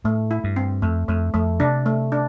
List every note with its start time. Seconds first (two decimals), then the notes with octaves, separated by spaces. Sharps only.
0.04 A2 A3
0.31 E4
0.44 G2
0.56 C4
0.82 F2 A3
1.08 F2 A3
1.34 F2 A3
1.60 C3 D4
1.86 A3
2.12 D4